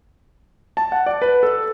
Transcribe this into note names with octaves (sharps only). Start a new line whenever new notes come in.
A5
F#5
D5
B4
A4